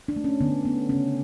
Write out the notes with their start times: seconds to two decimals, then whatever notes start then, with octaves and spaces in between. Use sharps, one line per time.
0.08 D4
0.16 A3
0.24 C#4
0.41 D3 B3
0.65 A3 B3
0.89 C#3 C#4